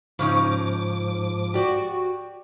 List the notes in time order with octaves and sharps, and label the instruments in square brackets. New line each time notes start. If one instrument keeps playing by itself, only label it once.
[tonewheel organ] G#2 F3 D6 [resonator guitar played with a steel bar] C#3 C#4 D#4
[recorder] F#4 [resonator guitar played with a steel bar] G4 D5